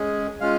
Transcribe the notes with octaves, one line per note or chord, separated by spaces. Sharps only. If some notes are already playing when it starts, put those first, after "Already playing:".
Already playing: G#3 C#4 G#4
G#3 C#4 F4 F5